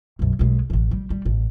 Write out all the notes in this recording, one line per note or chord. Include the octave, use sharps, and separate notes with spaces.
B1 F#2
B1 G#3
A1 E3
G3
G3
A1